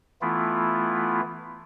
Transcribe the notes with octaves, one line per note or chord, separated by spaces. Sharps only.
E3 A3 B3 E4 F4